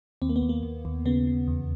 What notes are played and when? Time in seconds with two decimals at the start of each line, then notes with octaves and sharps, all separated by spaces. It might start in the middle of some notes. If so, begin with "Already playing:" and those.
0.22 D#2 C4
0.29 A#3
0.36 B3
0.42 D#2
0.49 A#3
0.63 D#2
0.85 D#2
1.05 C#3 B3
1.27 C#3
1.48 E2